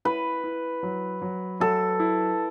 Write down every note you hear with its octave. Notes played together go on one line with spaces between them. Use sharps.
E4 B4
E4
F#3
F#3
F#3 A4
E4